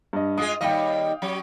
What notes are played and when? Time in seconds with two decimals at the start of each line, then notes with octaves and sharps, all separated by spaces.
0.13 G2 D#5
0.38 G#3 F4 G#4 D#6
0.61 D#2 G3 D#5 F5 G5
1.22 F#3 C#4 G4